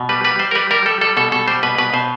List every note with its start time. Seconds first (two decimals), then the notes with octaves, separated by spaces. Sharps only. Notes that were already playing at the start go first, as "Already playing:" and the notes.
Already playing: B2
0.09 G3 B4
0.24 G3 B4
0.39 G3 C5
0.51 A#4
0.55 G3 B4
0.71 G3 A#4
0.86 G3 A4
1.01 G3 A4
1.17 B2 A4
1.32 B2 A4
1.48 G3 C5
1.63 B2 B4
1.78 B2 B4
1.94 B2 C5